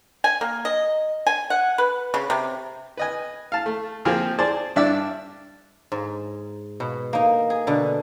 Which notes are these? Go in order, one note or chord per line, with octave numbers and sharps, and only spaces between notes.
G#5
A#3
D#5
G#5
F#5
B4
C#3
C3
B4 D#5 G#5
F5 A5
A3
F3 A#3 C4 F4 G4 G#4
G#4 C5 D5 A5
G2 D4 D5 E5 D6 E6
G#2
B2
A#3 D#4
G#4
B2 D3